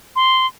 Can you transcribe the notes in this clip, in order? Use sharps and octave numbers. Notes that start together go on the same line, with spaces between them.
C6